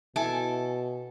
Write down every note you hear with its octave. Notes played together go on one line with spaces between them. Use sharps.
B2 E4 A4 E5 G#5